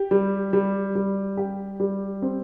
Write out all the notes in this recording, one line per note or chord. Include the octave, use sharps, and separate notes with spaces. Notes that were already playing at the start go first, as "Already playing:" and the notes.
Already playing: G4
G3
G3
G3
G4
G3
C4